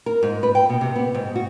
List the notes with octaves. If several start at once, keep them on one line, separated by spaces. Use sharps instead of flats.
A#4
G#2
B4
G5
B2
C3
B3
G#2
F#4